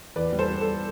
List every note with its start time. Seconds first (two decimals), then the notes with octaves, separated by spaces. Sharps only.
0.16 E2 B4 D5
0.33 G3
0.39 A4 C5
0.50 G3
0.61 A4